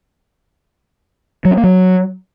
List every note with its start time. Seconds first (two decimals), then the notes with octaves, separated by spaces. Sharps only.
1.45 F#3
1.51 C#4
1.57 A#3
1.64 F#3